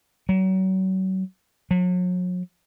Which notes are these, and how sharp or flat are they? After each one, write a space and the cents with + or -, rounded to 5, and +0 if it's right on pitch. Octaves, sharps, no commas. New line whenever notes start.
F#3 +35
F#3 -40